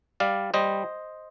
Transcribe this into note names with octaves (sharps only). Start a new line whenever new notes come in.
G3 D5 F5
G3 C5 D#5